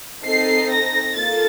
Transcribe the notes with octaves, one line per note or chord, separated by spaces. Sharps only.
C4 D#4 A4 C7
A#6
A#3 F4 A4 A6